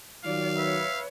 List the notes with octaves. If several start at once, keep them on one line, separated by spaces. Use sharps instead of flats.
D#3 F#3 F4 D5 F5
B4 C#5 E5